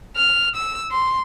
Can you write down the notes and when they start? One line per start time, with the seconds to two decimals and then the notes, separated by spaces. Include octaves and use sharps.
0.16 F6
0.56 E6
0.92 C6